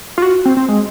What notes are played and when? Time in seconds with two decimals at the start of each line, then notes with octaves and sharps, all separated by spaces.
0.18 F4
0.22 F#4
0.45 C4
0.57 C4
0.68 G#3